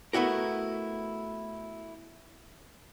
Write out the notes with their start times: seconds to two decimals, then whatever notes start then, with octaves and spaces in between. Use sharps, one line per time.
0.13 A3 B3 E4 F#4 A#4